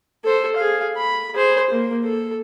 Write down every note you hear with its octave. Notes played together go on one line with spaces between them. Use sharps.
A4 C5
G#4 F5
B5
G#4 C5
A#3
A4